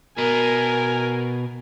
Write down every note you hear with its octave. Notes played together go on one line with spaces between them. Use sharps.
B2 A#4 G#5